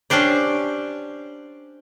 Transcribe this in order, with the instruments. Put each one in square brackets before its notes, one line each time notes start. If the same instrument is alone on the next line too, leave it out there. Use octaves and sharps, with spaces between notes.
[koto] C#4 D4 G4 C5 D5